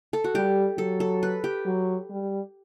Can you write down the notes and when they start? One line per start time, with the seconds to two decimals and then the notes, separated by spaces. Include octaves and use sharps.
0.13 A4
0.24 F#4
0.35 G3 G4
0.78 F#3 A4
1.00 A4
1.23 B4
1.44 G4
1.66 F#3
2.10 G3